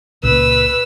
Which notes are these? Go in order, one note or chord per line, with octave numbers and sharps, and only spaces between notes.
C#2 A#2 B4 E6